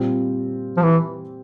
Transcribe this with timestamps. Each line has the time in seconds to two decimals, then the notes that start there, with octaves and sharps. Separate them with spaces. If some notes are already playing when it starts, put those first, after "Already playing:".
Already playing: A#2 G3 C4 F4
0.77 F3
0.83 E3